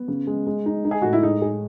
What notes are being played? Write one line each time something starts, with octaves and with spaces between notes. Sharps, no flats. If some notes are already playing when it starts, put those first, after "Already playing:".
Already playing: B3
C#3
G#3
G#3
D#4
D#4
G#4
A2 F#4
E4
G#3 D#4
G#4